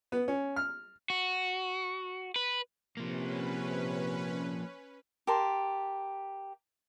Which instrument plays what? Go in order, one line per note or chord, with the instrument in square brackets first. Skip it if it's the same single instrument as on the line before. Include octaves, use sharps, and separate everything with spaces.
[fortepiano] B3
C#4
F6
[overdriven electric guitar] F#4
B4
[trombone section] C3 [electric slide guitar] F3 A#3 [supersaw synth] C#4 B4
[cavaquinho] G4 A#4 A5 C6